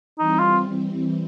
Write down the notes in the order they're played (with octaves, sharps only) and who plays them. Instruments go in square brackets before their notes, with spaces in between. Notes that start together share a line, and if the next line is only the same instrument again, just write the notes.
[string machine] E3 G3 C4 [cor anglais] D#4
[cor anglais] F4